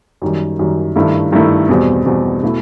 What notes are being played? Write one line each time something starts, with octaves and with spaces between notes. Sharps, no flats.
F#2 D#3 G3
F#2 D#3 G3
G2 D#3 A3 E4
G2 D#3 A3 E4
E2 B2 G3 C4
E2 B2 G3 C4
B2 A3 E4